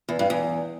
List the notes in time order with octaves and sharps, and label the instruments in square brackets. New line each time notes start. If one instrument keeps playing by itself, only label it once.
[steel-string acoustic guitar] E2
G2
E2